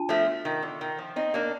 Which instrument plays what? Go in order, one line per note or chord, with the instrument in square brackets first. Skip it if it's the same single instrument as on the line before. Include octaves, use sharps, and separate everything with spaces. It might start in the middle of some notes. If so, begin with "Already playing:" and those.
Already playing: [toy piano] D4 F4 A5
[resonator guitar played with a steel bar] F3 A3
D#3
D3
D#3
F3
C4 D#4
A#3 D4